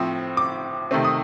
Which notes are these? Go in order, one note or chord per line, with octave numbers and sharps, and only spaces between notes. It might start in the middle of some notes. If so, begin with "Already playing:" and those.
Already playing: A2 F3 C4
D6
C3 D#3 A3 C4
D#6